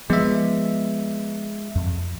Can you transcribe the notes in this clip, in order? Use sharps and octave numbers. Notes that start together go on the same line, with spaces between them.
F3 G#3 B3 E5
F2